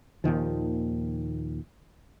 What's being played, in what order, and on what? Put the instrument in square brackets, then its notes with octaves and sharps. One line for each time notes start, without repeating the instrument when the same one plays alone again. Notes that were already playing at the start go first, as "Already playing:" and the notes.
[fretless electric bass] D#2 A#2 D#3 F3